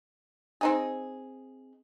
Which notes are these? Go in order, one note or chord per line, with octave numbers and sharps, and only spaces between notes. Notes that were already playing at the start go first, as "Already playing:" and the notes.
C4 D#4 G#4